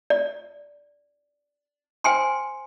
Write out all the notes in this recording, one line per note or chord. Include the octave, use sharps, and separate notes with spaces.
D5
C5 G5 G#5 C6